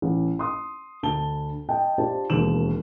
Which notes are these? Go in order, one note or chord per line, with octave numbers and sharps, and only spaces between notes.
A1
C6 D#6
D2 A5 G7
D#5 G5 A5
D4 F4 G4 C5 A5
E1 D#2 E7 F#7